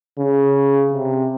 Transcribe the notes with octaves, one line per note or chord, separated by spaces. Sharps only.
C#3
C3